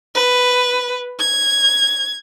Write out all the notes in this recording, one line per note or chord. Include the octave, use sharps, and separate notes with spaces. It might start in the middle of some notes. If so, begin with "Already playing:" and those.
B4
G#6